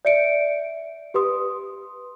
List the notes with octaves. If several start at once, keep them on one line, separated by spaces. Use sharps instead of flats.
D5 E5 C#7 D7
G4 B4 C6 D#6